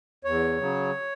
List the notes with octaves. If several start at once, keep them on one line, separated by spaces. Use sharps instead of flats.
E2 C#5
C#3 F#3